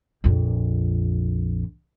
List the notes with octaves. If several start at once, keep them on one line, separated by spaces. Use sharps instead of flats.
A#1 F2